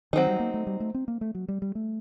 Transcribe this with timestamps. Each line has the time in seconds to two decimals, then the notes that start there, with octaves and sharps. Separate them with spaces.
0.13 D#3 F#3 C4 D#4
0.27 G3
0.40 A#3
0.54 A3
0.67 G3
0.80 A3
0.94 C4
1.08 A#3
1.21 A3
1.35 F#3
1.48 G3
1.62 G3
1.75 A3